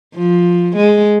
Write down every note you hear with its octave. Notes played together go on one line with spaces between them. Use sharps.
F3
G#3